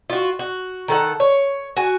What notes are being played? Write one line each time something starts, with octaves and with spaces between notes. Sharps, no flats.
F4 F#4
F#4
D#3 A4 F#5
C#5
F#4 G#5